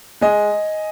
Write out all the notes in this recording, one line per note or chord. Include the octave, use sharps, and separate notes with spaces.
G#3 D#5 G#5